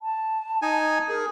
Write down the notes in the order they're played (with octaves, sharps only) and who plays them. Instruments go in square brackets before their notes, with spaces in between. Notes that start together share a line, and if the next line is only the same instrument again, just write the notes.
[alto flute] A5
[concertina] D#4 G#5
[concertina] G#4 [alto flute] A#4